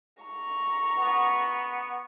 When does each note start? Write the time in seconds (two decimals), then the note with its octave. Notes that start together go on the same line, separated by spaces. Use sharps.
0.23 A#5 C#6
0.97 B3